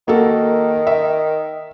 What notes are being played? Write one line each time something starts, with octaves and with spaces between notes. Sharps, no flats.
D#3 A#3 F#4 A4
E5